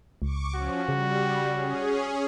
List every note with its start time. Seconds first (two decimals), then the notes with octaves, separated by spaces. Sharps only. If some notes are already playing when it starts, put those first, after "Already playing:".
0.22 C#2 C#6 D6
0.55 F3 C#4 F#4
0.88 C#3 G3
1.51 C#4 G#4